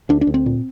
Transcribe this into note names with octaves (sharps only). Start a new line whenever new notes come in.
D2 D4
D4
D2
C4
A#2